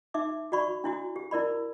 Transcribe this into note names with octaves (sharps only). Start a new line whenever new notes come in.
D#4 E5 D6
F#4 D5 B5 C#6
D4 E4 F#4
G4
E4 A#4 D5 B5